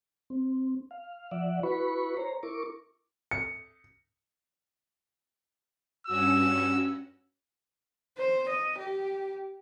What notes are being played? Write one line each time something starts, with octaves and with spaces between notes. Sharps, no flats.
C4
F5
F3 D5 E5 F#5
E4 F#4 B4 B5 C#6
C5 C#5 A#5
E4 A#4 C#6 D6
C#7
G2 C#4 F#4 E6
C5
D#5
G4